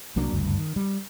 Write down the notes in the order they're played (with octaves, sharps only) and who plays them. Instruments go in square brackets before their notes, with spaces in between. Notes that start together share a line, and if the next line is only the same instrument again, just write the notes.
[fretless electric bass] C2 F#3 A#3 D4
F#1 D2 G2
D#3
G3